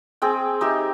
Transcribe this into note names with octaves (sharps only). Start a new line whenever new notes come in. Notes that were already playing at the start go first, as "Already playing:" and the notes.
C4 G#4 G5
D#4 G4 E5